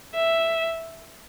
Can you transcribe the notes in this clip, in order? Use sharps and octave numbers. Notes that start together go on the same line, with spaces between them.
E5